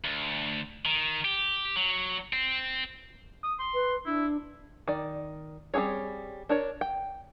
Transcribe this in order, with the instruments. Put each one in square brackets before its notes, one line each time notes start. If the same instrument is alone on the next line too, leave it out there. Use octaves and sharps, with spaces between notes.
[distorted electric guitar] D2
D#3
G4
F#3
C4
[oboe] D#6
C6
[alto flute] B4
[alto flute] D4 [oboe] E4
[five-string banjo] D#3 D5
G3 C4 C#4 G#4 C#5
D4 A#4 C#5
G5